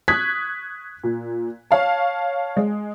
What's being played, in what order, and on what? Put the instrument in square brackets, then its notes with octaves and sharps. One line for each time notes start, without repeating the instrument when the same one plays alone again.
[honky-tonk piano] C#6 D#6 F#6 G#6 B6
A#2
C#5 F5 A5
G#3